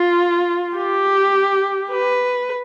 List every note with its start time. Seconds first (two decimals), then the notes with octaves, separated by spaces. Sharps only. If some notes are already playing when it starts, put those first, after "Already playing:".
Already playing: F4
0.77 G4
1.91 B4